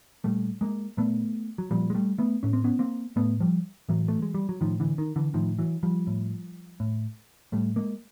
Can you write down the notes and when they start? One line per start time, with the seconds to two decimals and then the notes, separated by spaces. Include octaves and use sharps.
0.24 A#2 G3 A3
0.61 G#3 A#3
0.97 A#2 A3 B3
1.58 F#3
1.71 A#2 F3 G3
1.90 G#3
1.95 G3 A3
2.18 A3 B3
2.43 A2 C#4
2.53 C4
2.64 B3 C#4
2.79 A#3 C4
3.16 A2 A3 B3
3.40 F3 G3
3.89 A2 E3 F#3
4.08 A3
4.22 G#3
4.34 G3
4.49 F#3
4.61 A2 D#3 F3
4.80 D3 E3
4.98 D#3
5.16 D3 E3
5.34 A2 D#3 F3
5.59 E3 F#3
5.83 F3 G3
6.07 A2
6.80 A2
7.52 A2 G3 A3
7.76 G#3 A#3